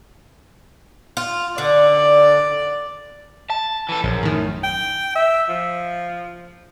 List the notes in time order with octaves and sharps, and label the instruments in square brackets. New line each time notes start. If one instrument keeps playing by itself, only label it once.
[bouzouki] F4
[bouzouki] D3 [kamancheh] D5
[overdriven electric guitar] A5
E3 A4
[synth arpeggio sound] A#1 [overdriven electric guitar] F#2
[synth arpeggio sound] A2 D#3
[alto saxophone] G5
E5
F3